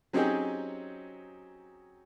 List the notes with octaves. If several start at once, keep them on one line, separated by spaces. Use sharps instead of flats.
F#3 C4 C#4 D#4 G4 G#4